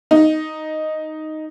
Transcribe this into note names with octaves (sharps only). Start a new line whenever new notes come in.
D#4